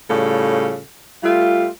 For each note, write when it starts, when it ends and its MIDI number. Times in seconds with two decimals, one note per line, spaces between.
0.10 0.80 45
0.10 0.80 49
0.10 0.80 55
0.10 0.80 65
0.10 0.80 69
1.23 1.67 55
1.23 1.67 57
1.23 1.67 65